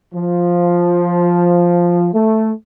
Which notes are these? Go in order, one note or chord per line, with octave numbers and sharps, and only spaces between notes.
F3
A3